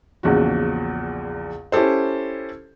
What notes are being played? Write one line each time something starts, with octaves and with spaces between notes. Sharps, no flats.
A#1 E2 C#3 F#4
C#4 E4 G4 A4 C5